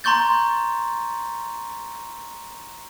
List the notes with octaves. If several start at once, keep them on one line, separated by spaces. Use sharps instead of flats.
A#5 C6 C#6 G6 A6